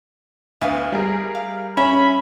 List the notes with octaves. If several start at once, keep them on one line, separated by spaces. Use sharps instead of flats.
D2 B3 E5 F5 D#6
G3 G#4 A#4
F5
C#4 E5 B5